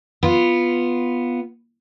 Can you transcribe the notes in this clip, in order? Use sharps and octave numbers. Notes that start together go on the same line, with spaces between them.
B3 F4